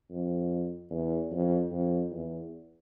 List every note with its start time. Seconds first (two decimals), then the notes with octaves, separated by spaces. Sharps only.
0.11 F2
0.90 E2
1.32 F2
1.71 F2
2.11 E2